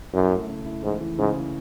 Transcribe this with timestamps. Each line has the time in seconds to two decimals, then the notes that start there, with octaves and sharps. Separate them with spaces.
0.13 F#2 E4
0.31 A3
0.49 C#3
0.66 E4
0.83 G#2 E3
1.00 E3
1.19 G#2 C#3
1.36 E3